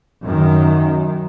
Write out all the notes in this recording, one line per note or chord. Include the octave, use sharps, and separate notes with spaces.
F#2 D#3